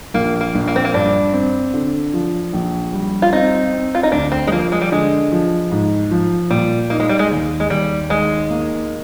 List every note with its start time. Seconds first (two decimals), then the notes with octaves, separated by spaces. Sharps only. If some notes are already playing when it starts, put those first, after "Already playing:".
0.14 A#1 A#3
0.41 A#3
0.55 A#1
0.68 A#3
0.76 C4
0.85 A#3
0.94 G2 D4
1.33 C4
1.74 D3
2.13 F3
2.53 A#1
2.93 G3
3.22 F4
3.33 C4 D#4
3.73 C4
3.95 F4
4.03 D#4
4.12 D2 D4
4.32 C4
4.47 G#3
4.52 F3 A#3
4.72 G#3
4.82 G3
4.92 D3 G#3
5.32 F3
5.72 G#2
6.11 F3
6.50 A#2 G3
6.90 A#3 D#4
7.00 G#3
7.09 G3
7.19 G#3
7.31 D#2
7.60 G#3
7.70 D#2 G3
8.10 D#3 G#3
8.50 A#3